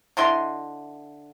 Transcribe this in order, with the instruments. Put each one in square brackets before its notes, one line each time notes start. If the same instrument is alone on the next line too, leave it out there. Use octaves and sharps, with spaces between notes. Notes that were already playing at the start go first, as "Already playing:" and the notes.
[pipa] D3 E4 D#5 C6